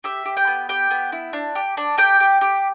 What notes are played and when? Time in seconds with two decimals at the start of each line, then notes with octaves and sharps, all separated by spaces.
0.04 G4 E5
0.26 G4
0.37 G5
0.47 B3
0.69 G4 G5
0.91 B3
1.12 E4
1.33 D4
1.55 G4
1.77 D4
1.98 G4 G5
2.20 G4
2.41 G4